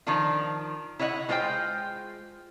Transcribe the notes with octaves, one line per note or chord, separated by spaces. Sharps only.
D#3 F3 D4 F4
E4 C#5 D#5 F5 F#5
G#3 F4 C5 D5 G5